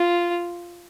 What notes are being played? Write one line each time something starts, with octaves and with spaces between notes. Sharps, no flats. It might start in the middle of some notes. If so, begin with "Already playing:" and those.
Already playing: F4